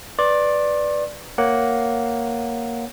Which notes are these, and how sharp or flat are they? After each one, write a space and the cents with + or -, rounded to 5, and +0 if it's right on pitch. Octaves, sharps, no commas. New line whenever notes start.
B4 +0 D5 +0 C6 +40
A#3 +0 C#5 +0 F#5 +0